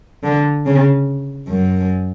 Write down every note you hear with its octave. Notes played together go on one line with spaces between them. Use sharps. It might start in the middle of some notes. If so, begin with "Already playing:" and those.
D3
C#3
F#2